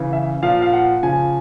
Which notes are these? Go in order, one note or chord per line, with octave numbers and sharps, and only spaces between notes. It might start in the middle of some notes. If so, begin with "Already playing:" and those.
Already playing: C#3 E3
E5
A#2 F3 F5
F5
F#5
C#3 F3 G#5